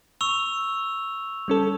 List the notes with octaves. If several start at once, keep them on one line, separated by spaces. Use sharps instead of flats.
C#6 E6 F7
G3 C#4 A4